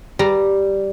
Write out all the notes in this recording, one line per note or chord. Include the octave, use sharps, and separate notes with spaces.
G3 A#5